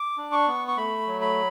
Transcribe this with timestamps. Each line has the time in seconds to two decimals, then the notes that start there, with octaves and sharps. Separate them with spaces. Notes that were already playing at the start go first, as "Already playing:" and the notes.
Already playing: D6
0.18 D4
0.32 C#6
0.48 B3
0.68 C#6
0.77 A3 B5
1.07 F#3
1.21 B5